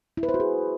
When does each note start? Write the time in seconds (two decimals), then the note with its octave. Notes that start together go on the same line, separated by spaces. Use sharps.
0.17 E4
0.23 B4
0.29 C5
0.34 F#4
0.40 G#4